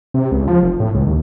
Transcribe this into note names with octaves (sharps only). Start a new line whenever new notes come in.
C3
C#2
F3
F1
A2
C#2
D#2